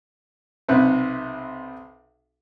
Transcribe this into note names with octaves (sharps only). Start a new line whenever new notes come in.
B1 C3 C4 B4